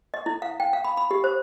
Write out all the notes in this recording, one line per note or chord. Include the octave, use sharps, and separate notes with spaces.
D#5
E4
F5
G5
F5
B5
B5
G4
C5